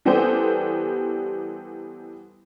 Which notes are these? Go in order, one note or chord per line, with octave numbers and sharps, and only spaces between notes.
E3 G3 B3 G4 A4 C5